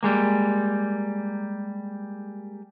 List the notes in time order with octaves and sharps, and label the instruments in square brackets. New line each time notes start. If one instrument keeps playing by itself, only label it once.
[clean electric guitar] G3 G#3 A#3